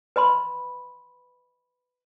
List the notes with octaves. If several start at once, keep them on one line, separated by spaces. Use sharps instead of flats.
B4 D#5 B5 C6